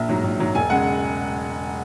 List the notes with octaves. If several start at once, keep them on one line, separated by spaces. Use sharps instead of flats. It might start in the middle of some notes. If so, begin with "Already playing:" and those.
Already playing: A#1 E5
G#2 F#3
A#1
G#2 F#3
E1 G#5
C#3 G#3 F#5